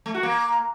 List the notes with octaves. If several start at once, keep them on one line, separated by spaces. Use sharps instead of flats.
A3
F#4
A#3